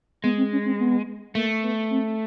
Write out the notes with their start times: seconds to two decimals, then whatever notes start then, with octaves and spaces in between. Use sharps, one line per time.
0.24 G#3 B3
0.38 C4
0.52 C#4
0.66 C4
0.80 B3
1.35 A3 A#3
1.63 B3
1.91 C4